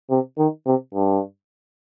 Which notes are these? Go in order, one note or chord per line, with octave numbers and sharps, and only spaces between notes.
C3
D#3
C3
G2